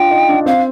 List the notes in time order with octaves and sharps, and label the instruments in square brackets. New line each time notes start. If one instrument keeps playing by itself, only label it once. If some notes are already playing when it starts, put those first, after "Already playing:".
Already playing: [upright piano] D4 F4 [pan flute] G5
[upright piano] D#4
D4
[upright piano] C4 [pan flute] F5